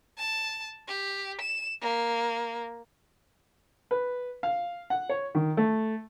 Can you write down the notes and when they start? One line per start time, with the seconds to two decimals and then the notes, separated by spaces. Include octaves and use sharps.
0.18 A5
0.88 G4
1.41 E7
1.82 A#3
3.91 B4
4.43 F5
4.90 F#5
5.09 C#5
5.35 D#3
5.57 A3